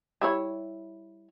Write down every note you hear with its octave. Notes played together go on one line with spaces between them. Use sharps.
G3 E4 C#5